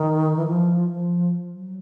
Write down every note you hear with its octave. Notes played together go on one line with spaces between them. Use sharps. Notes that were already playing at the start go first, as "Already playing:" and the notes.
Already playing: D#3
E3
F3
F3
F#3